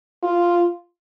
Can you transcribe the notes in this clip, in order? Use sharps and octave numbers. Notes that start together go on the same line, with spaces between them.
F4